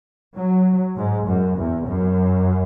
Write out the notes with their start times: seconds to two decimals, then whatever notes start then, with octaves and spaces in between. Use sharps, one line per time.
0.37 F#3
0.97 G#2
1.28 F#2
1.58 E2
1.87 F#2